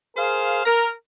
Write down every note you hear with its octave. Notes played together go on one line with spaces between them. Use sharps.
G#4 A#4 C5 F5
A#4